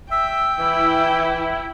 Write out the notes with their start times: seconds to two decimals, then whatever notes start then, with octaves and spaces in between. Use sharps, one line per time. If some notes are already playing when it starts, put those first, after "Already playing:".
0.11 E5 G5 E6
0.59 E3 E4